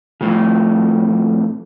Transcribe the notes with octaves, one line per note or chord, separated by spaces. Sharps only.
F2 A2 C#3